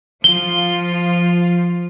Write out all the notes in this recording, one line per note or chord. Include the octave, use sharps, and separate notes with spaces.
F3 F4 G7